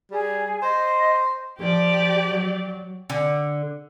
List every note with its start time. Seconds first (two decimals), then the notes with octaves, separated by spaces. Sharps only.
0.12 G3 G#4
0.63 C5 D#5
1.59 F3 G4 D5
2.27 F#3
3.10 D3